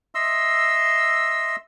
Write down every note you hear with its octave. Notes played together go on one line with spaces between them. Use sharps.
D#5 E5 C6 E6